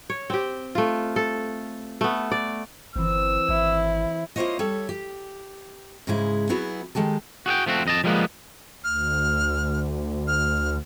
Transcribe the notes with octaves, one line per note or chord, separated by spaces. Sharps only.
C#5
C4 G4
A3 F4
A4
A3 B3
D5
G1 E3 C4 E6
G#1 E4
A#3 E4 F4 C5 C#5 D#5
G3 A4 C#5 E5
G4
G#2 C#3 G#3 E4
F#3 B3 E4 F#4 G#4
D#3 G#3 G4 A4
F#4 G#4 F#5 G5
F3 A3 C4 F#4
F2 D#5 A5
F3 G3 G#3 A#3 B3
D2 F6
F6